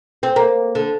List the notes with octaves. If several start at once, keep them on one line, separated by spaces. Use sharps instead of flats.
C4
A#3
D3